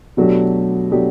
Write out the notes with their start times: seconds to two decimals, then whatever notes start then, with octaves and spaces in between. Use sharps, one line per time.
0.17 B2 F#3 A3 D4 G4
0.91 B2 F#3 A3 D4 G4